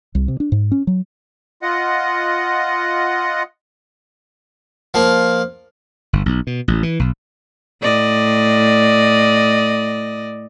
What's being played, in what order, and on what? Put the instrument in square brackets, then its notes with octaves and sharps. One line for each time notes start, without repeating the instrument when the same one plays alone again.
[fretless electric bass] C2
C3
D4
G#2
C#4
F#3
[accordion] F4 D#5 F#5
[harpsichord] F3 A#3
[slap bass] G1
B1
B2
A1
E3
B1
[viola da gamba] A2 D5 D#5